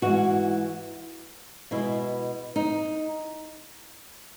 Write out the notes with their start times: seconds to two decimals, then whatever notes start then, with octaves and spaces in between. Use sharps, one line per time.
0.02 G#2 E3 G#3 F#4
1.71 B2 G#3 E4
2.56 D#4